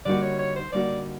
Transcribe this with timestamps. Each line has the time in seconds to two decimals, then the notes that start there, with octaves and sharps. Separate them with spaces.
0.05 D3 G3 A#3 D#4 F#4 D5
0.22 C#5
0.39 C#5
0.56 C5
0.73 D3 G3 A#3 D#4 F#4 D5